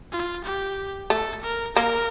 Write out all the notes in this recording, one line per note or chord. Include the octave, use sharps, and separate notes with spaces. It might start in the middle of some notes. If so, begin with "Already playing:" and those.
F4
G4
A3 A4
A#4
A#3 A#4